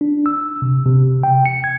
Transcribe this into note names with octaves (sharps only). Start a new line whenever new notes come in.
D4
E6
C3
C3
G5
C#7
G#6